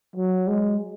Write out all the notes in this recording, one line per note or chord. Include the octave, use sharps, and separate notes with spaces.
F#3
G#3